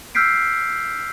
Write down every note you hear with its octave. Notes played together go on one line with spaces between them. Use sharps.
E6 F6 G6 B6 C7 D7